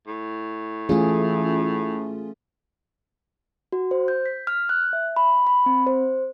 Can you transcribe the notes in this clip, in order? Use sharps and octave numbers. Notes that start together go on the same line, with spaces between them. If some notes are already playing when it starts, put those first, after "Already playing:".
A2
E3 A3 C#4 F4 G#4
F#4
C5
G6
B6
F6
F#6
E5
B5
B5
C4
C5